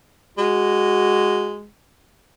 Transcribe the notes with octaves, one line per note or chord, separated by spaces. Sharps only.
G#3 F#4